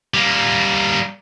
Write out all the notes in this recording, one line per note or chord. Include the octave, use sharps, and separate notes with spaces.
G3 A#3